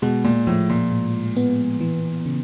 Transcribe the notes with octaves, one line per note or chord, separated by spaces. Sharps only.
B2 G#3
A#2
A2 F3
A#2
A2
B3
E3
C#3